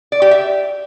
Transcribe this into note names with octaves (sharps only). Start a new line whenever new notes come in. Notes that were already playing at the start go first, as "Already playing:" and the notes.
D5
G4
E5